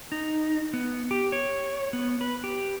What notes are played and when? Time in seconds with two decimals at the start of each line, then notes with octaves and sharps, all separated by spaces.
0.12 D#4
0.74 B3
1.11 G4
1.32 C#5
1.93 B3
2.21 B4
2.44 G4